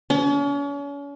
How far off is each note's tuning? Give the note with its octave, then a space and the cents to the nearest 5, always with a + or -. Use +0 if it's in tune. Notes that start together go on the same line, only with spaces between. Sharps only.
C#4 +40